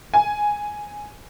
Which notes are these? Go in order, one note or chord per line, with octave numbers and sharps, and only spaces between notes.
G#5